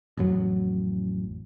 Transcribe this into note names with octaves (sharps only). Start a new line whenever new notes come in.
A1 F2 F#3